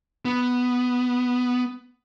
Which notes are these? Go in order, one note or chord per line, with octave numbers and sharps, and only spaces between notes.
B3